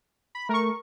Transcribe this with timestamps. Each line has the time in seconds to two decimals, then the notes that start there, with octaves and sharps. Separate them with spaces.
0.35 B5
0.49 A3 A#4 C#6